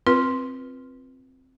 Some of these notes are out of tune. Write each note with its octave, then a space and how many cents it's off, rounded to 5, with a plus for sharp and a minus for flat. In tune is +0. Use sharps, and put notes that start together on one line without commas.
C4 +0 F4 +0 B4 -20